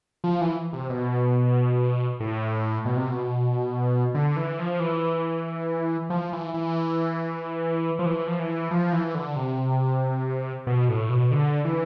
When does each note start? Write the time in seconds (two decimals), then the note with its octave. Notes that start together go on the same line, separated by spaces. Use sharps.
0.24 F3
0.41 E3
0.73 C3
0.90 B2
2.20 A2
2.85 B2
2.97 C3
3.09 B2
4.15 D3
4.36 E3
4.59 F3
4.80 E3
6.10 F3
6.33 E3
6.54 E3
7.99 F3
8.06 E3
8.27 F3
8.39 E3
8.71 F3
8.93 E3
9.15 D3
9.36 C3
10.67 B2
10.89 A2
11.10 B2
11.31 D3
11.65 E3